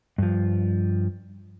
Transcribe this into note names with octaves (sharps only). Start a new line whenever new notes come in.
G2 F3